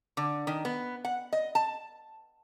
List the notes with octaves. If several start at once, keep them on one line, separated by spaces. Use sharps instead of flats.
D3
D#3
B3
F#5
D#5
A5